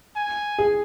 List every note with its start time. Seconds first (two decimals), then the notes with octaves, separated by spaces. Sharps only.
0.16 G#5
0.58 G#4